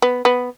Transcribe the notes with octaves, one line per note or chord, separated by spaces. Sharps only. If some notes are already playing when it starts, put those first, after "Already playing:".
B3
B3